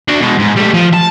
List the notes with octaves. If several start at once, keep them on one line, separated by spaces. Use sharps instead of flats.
D4 F#4
B2 G#3
G#2
G3 A3
F3
A5